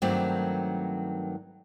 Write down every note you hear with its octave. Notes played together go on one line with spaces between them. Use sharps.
G2 D#3 F#3 A3 A#3 C4